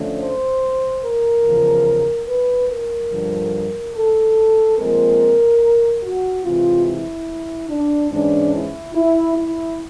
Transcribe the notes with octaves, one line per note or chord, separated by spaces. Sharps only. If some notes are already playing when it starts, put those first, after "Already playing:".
Already playing: D3 F3 A3 C#4
C5
A#4
E2 C#3 F3
B4
A#4
G2 D3 F3
A4
A#2 F3 G#3 C4 A#4
F#4
C3 E3 G#3 F4
E4
D4
G#2 E3 G#3 C#4 D4
E4
E4
E4